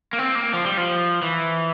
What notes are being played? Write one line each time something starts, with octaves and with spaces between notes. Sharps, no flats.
A#3
C4
A#3
F3
G3
F3
E3